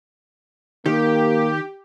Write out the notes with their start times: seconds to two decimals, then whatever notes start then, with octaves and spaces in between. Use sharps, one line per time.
0.86 D#3 A#3 G4